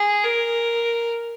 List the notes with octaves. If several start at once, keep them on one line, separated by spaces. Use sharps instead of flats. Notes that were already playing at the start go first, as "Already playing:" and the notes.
Already playing: G#4
A#4